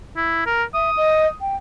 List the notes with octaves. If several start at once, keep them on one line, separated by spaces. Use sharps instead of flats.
E4
A#4
E5 D#6
D#5
G5